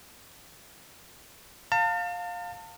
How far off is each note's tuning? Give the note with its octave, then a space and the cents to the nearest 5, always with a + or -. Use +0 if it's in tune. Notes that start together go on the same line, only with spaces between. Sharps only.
F5 +15 A5 +40